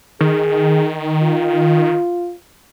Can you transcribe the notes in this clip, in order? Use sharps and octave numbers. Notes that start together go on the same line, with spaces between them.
D#3 G#4
F4